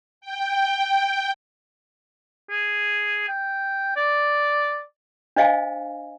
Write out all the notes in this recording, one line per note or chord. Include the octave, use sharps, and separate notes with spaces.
G5
G#4
G5
D5
D4 C5 D#5 F5 G#5